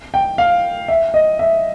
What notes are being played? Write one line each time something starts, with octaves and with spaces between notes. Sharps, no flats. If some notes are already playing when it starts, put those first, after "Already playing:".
G5
F5
E5
D#5
E5